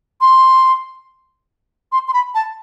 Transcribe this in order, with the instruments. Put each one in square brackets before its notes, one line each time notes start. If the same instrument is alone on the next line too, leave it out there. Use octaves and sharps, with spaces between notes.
[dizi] C6
C6
C6
B5
A5